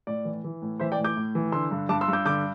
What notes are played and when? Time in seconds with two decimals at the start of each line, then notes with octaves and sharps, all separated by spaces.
0.07 A2 D5
0.25 E3
0.44 E3
0.62 A2
0.80 E3 C5 E5
0.92 D5 G5
0.98 A2
1.04 D6 G6
1.16 A2
1.35 E3
1.52 D3 C6 E6
1.71 G2
1.89 G2 A5 D6
2.01 C6 E6
2.08 G2 D6 G6
2.26 D3 D6 G6